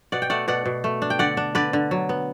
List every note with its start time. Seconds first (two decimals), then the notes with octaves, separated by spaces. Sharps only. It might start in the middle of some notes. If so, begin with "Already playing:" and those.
0.12 B2 D5 F#5
0.22 G5
0.30 A3 D5 F#5
0.48 B2 D5 F#5
0.66 B2
0.84 A3
1.02 D4
1.10 G5
1.19 D3 D5 F#5
1.37 D4
1.55 D3 B4 D5
1.73 D3
1.91 F#3
2.09 B3